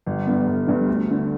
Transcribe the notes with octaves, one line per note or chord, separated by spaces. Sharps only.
G1
G2 D3 B3
G1
G2 D3 B3
D2
D3 A3